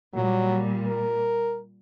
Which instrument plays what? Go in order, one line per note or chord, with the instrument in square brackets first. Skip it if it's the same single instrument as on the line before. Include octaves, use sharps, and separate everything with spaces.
[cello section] A#2 G3 [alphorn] F#3
[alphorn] A#4